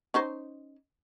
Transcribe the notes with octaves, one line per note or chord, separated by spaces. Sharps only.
C#4 D#4 C5